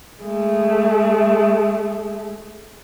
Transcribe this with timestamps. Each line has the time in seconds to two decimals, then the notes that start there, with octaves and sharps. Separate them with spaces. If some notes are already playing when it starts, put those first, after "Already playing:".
0.22 G#3 A3